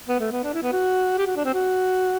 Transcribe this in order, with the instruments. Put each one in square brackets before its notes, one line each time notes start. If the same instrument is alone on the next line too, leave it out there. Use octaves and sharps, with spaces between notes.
[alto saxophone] B3
A3
B3
D4
E4
B3
F#4
G4
F#4
D4
C4
F#4